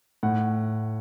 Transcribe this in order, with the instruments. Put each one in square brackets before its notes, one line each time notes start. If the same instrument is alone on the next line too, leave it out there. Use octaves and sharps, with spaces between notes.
[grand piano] A2 F#5